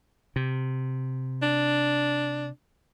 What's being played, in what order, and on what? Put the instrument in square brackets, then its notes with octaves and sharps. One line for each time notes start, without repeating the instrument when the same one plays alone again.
[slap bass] C3
[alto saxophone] D4